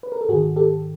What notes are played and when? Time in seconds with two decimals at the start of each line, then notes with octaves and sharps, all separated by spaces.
0.03 B4
0.12 A#4
0.21 A4
0.29 G#2 D#3 F#4 G#4
0.56 G4 A4